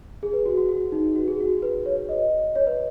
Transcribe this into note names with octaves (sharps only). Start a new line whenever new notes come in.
G#4
B4
F#4
F#4
F#4
D#4
F#4
G#4
F#4
B4
C#5
D#5
C#5
B4